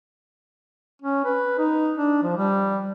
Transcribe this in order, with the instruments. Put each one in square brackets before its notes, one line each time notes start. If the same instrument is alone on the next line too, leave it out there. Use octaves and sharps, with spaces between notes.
[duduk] C#4
B4
D#4
D4
F3
G3